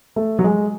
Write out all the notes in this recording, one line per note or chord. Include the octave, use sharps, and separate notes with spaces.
A3
F#3
G#3